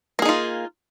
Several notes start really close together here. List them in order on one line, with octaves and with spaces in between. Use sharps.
A#3 G#4 D#4 F4